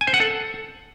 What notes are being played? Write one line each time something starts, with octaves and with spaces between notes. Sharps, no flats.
G#5
C5
F#5
A4